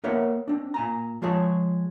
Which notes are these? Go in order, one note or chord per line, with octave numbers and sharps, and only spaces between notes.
A#3 B3 A#4 C#5 E5
C4 D4
A#2 G#5 A#5
F3 G#3 G#4 C#5 A5